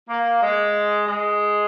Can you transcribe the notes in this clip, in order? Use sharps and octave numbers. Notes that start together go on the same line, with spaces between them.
A#3
G#3
G#3